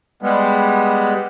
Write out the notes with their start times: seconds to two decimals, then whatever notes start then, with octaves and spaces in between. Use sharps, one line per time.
0.23 G3 G#3 B3